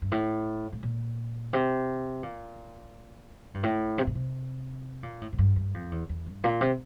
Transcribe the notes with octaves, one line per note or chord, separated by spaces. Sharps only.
G2
A2
A2
A#2
C3
A#2
G2
A2
C3
A#2
C3
A#2
A2
A2
G2
G2
F2
E2
E2
G2
A#2
C3